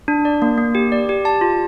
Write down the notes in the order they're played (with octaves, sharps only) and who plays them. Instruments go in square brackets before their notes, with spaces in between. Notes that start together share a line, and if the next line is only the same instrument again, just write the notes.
[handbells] D4
D5
A#3
A#3
G4
D5
G4
A5
F4